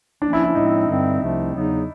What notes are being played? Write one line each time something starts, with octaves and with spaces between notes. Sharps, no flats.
F3 A#3 C#4 D4
E4
E4
A2 F3 G#3 C4 D#4 E4
G2 D3 G3 C4
C2 C3 F3 A3 C4
E2 C#3 F#3 B3 D#4